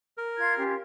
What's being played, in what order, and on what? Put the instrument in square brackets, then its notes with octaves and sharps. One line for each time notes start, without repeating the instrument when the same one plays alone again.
[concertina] A#4
[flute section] F4 G#6
C#4 F4 G4